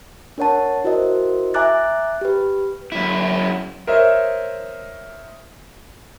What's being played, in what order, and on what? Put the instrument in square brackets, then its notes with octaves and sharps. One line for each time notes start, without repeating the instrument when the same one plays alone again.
[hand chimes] D4 A#4 C#5 F#5 A5
E4 F#4 A#4 C5 D#5
E5 G#5 A#5 D6 F#6 A6
G4 B4
[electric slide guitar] F#2 E4
[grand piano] A#4 C5 C#5 D#5 E5